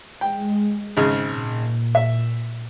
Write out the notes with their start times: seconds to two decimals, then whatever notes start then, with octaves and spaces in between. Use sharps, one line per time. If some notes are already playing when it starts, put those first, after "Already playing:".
0.21 G#3 G5
0.97 G#1 C#3 G#4
1.29 A#2
1.95 E5